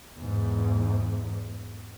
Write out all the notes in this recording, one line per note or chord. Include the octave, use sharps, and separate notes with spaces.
E2 G#2